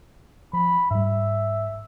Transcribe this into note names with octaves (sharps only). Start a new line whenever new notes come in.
F3 B5
G#2 G3 E5